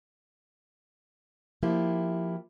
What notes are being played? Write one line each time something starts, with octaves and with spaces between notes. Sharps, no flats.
F3 A#3 E4 G4